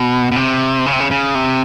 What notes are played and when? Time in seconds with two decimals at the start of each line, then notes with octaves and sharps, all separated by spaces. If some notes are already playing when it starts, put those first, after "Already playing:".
Already playing: B2
0.32 B2
0.36 C3
0.86 C#3
0.93 C3
1.00 C#3
1.11 C#3
1.35 C3